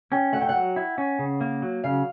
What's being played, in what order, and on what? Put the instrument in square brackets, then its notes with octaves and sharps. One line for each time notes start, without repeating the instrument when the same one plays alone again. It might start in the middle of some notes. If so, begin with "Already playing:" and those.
[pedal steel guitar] C#4 [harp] G5
[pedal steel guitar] A3 [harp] F#5
[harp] G5
F#5
[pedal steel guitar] F#3
E4
C#4
C#3
A#3
F#3
[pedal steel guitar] C#3 [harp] F5